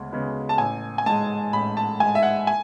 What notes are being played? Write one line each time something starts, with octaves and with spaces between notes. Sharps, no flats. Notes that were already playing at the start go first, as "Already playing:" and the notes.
Already playing: D2 C#3 G#3 B3
C#3 G#3 B3
A5
A1 G#5
G#5
G#2 G#3 A5
A1 B5
A5
G#2 G#3 G#5
E5
F#5
G#5